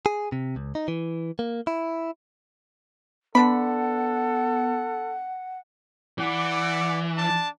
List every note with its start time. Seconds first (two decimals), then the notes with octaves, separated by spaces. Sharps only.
0.06 G#4
0.32 C3
0.56 C#2
0.75 D#4
0.88 E3
1.39 A#3
1.67 E4
3.35 D3 B3 D4 A4 F#5 B5
6.18 E3 D5 F#5 D6
7.16 D4 A5